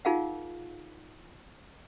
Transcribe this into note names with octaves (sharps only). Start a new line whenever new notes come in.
D#4 F4 G#4 A#4 F5 F#5